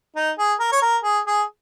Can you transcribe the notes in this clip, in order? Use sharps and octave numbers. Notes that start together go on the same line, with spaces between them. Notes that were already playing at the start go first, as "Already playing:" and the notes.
D#4
G#4
A#4
C#5
A#4
G#4
G#4